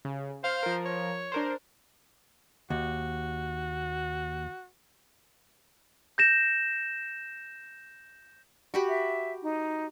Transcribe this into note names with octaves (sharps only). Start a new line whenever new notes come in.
C#3
C5 F5
F3 A#4
C#5
D4 A#4 C5
D#2 F#4
G6 A#6 E7
F#4 G4 B5
E5
D#4